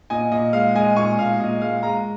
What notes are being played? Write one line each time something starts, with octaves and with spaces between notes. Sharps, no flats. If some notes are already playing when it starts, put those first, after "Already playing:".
A#2 D#5 G#5
A#2 D#5
G#3 F5
G#3 D#5 G#5
A#2 G#5 C#6
A#2 F5
A#2 D#5
G#3 F5
G#3 F5 A#5